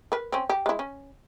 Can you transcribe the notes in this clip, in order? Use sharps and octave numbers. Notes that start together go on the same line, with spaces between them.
A#4 B4
C4 C#4
G4
G#3 E4
C#4